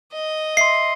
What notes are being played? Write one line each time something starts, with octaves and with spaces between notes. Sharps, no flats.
D#5
E5 C6 C7